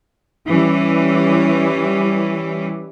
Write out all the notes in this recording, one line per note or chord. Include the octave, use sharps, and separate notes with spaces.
E3 G3 C#4 G4